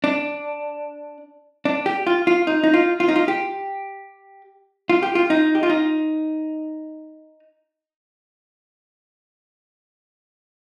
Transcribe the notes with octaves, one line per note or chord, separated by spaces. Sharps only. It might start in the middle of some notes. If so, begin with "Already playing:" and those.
D4
D4
G4
F4
F4
D#4
D#4
F4
F4
D#4
F4
G4
F4
G4
F4
D#4
G4
F4
D#4